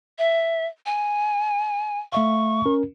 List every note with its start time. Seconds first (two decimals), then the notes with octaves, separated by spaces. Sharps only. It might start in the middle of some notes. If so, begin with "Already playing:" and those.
0.18 E5
0.86 G#5
2.12 A3 E5 F5 C#6
2.66 C#4 A#4